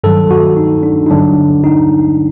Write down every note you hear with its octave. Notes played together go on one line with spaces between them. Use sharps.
G2 D#3 F#3 A4
F#4
D#4
D4
D#4
G2 D3 F#3 D4
D#4